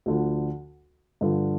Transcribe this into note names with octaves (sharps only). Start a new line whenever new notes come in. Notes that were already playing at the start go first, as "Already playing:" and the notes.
D2 D3 F3
G2 D3 F3